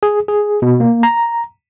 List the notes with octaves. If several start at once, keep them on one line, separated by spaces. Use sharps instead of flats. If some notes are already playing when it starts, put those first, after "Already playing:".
G#4
G#4
B2
A#3
A#5